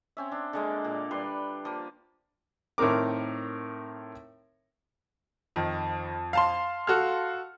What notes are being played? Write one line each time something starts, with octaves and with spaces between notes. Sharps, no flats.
C4 C#4 E5
D4 C6
D3 G#3 A#3
A#2
G3 B4 C6
F3 A#3
A2 D#3 C4 A#4 D6
F2 D#3
F5 A5 C6
F#4 A4 F6